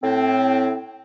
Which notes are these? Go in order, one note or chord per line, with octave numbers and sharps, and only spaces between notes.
A2 C4